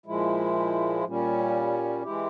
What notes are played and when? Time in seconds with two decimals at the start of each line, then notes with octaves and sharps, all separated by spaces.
0.06 A#2 F3 G#3 E4
1.04 A#2 G3 C#4
2.02 E3 G#3 E4 G4